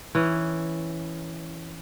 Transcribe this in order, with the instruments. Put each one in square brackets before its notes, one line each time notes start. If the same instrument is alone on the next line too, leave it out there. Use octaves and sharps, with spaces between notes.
[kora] E3 C#4